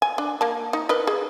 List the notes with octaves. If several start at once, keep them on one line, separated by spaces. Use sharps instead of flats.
G#5
D4
A#3 A5
D#4
A#4 B4 D#5
G#4